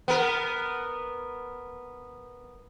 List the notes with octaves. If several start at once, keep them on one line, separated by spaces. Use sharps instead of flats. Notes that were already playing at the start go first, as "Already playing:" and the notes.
B3 A#4